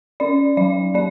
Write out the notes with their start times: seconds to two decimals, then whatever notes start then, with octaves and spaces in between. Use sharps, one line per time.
0.20 C#4 D5
0.57 F#3 D5
0.94 A#3 D5